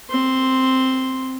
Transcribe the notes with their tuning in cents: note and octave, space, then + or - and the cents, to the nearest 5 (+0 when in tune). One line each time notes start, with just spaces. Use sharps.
C4 +0 C6 +0